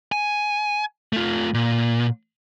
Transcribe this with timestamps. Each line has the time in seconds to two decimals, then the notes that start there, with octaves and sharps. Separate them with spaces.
0.12 G#5
1.13 A3 F4
1.54 A#2